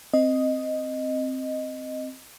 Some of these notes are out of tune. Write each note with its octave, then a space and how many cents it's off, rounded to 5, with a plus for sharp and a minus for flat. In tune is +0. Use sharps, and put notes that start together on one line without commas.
C4 +0 D#5 +0